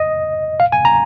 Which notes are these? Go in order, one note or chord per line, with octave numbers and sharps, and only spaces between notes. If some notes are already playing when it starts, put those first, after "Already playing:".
Already playing: D#5
F5
G#5
A#5